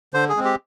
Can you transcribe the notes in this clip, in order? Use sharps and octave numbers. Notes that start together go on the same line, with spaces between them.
D3 C5
G#4
G#3 C4
G4